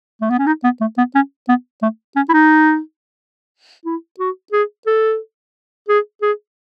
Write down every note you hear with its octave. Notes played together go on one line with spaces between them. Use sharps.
A3
B3
C#4
D#4
B3
A3
B3
C#4
B3
A3
C#4
E4
D#4
E4
F#4
G#4
A4
G#4
G#4